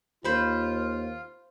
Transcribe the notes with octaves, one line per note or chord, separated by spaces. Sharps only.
D#2 F4 C5 B5